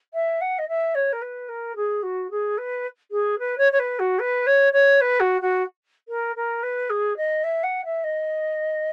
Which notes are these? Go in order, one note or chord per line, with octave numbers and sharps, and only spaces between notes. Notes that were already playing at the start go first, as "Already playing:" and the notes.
E5
F#5
D#5
E5
C#5
A#4
B4
A#4
G#4
F#4
G#4
B4
G#4
B4
C#5
C#5
B4
F#4
B4
C#5
C#5
B4
F#4
F#4
A#4
A#4
B4
G#4
D#5
E5
F#5
E5
D#5